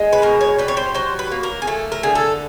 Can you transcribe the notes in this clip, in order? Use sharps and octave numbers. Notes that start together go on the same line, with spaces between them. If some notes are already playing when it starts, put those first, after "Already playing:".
Already playing: G#3
B4
B2 A#4
C#5
G3 B4
C#5
C5
F#3 C5
B4
A#3
A#4
G#4
A3 A4
A#4
D3 G#4
A4